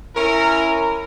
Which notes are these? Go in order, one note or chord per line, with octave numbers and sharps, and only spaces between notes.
C#4 E4 A#4